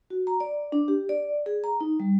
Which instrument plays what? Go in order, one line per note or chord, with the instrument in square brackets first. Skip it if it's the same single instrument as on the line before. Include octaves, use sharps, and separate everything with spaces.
[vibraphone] F#4
A#5
D5
D4
G4
D5
G#4
A#5
D#4
G3